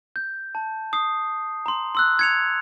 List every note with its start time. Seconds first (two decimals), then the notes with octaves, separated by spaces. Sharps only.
0.16 G6
0.55 A5
0.93 D#6 C7
1.66 A#5 C6
1.95 C6 E6 F#6
2.19 G#6 C#7 F7